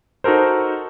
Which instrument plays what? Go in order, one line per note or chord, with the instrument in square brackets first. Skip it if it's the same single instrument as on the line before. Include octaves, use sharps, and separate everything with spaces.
[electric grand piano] D#4 F#4 A4 A#4 C5